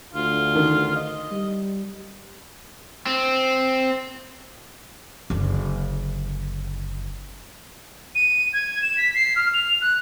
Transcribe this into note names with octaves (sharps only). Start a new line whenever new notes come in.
D2 F4
D#3
D#5
G3
C4
F#1 D3
D#7
G#6
E7
B6
C7
F6
F7
F#6